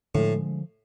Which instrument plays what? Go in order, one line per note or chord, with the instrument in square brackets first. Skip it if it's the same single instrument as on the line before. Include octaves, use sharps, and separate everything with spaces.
[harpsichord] A2 [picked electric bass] D3 F3 G#3